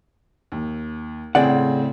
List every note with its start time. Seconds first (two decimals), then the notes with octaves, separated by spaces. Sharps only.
0.52 D#2
1.35 A2 C#3 C4 G#4 D5 F#5